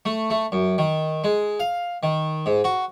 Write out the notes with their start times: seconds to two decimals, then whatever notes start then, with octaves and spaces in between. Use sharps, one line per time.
0.05 A3
0.30 A3
0.52 F#2
0.78 D#3
1.24 G#3
1.60 F5
2.03 D#3
2.46 G#2
2.64 F#4